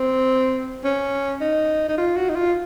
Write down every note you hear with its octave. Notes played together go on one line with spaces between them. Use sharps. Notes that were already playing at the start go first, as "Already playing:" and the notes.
Already playing: C4
C#4
D#4
D#4
F4
F#4
D#4
F4